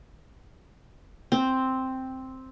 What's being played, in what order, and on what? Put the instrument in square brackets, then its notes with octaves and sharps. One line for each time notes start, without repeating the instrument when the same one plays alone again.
[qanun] C4